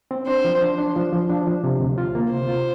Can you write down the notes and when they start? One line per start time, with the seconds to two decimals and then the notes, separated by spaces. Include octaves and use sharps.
0.11 C4
0.27 D4 C5
0.44 F3
0.62 D4
0.78 D4
0.96 F3
1.13 F3
1.30 D4
1.47 F3
1.64 C3
1.80 D2
1.98 F4
2.15 A#3
2.32 C3 C5
2.49 F4